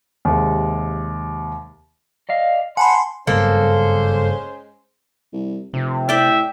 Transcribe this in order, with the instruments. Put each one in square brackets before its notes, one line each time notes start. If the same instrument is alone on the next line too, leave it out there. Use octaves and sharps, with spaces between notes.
[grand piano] D#2 C3 G#3
[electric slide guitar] D5 D#5 F5
[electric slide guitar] F#5 [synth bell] G#5 A5 B5 [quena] C6
[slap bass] F#1 G2 B3 [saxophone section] G#3 C#4 C5 [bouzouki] A#3 A4
[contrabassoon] C2
[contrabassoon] F1 [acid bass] C3
[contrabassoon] A2 [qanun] D5 G5 [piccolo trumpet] E5